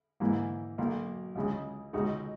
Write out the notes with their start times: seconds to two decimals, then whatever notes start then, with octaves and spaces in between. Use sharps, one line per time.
0.20 G#2 E3 A#3 E4
0.78 B1 B2 A#3
1.36 C#2 C#3 G#3
1.93 C#2 B2 G#3 D#4 F#4